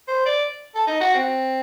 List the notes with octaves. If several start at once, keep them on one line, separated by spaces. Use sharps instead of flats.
C5
D5
A4
D#4
F#4
C4